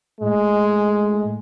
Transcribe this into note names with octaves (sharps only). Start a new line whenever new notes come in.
A2 G#3